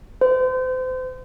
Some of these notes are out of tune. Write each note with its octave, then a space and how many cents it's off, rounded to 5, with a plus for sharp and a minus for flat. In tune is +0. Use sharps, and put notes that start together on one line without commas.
C5 -35